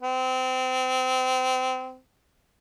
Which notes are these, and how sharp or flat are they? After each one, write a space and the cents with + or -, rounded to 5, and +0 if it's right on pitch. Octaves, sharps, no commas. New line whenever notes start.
C4 -25